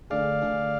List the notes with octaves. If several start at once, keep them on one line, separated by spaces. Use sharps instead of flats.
D3 A3 D4 G#4 D5 F5
D3 A3 D4 G#4